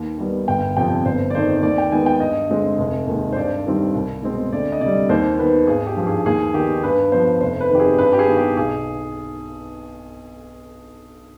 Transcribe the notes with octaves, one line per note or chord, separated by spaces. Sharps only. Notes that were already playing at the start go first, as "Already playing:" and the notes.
Already playing: D#2
D#3 G3 B3
G1 G5
F2 C3 F3 G5
G1 C5
D5
F2 D#3 C5
C5
D#2 D5
G5
D#3 G#3 B3 G#5
G5
G2 D#5
D3 G#3 C4
F1
D#2 D#3 G#3
C5
G2 D5
D#3 G3 C4
C2
B2 G#3 C4
D2 D5
D#5
C3 D5
G3
D#2 C5
D#3 B3 B4
G#1 G#4
G4
G2 F3
G#4
D#2 G#4
D#3 B3 G4
G2 B4
F3 B3 C5
F1 C5
B4
F2 D#3 G4
G#4
G2 B4
G4
G#4
D#3 B3
G4
B1 G#4